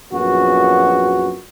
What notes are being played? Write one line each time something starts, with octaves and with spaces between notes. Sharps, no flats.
A#1 F#2 B3 F#4 G#4